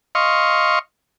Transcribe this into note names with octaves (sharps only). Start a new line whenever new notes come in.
D#5 F5 C6 C#6